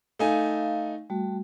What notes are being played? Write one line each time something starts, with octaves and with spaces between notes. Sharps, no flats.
A3 D#4 F5 G#5
G3 A3 F#4